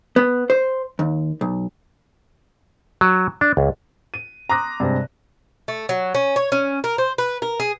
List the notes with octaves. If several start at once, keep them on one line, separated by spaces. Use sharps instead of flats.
B3
C5
D#2
B1
F#3
D4
C#2
D#7
A#5 C6 D6 D#6 F#6 A#6
G2 C3 G#3 C4
A3
F#3
C#4
C#5
C#4
A#4
C5
B4
A#4
G#4